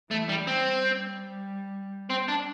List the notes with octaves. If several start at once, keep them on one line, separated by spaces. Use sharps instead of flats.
E3 A3
G3
G3 C4
C4
D4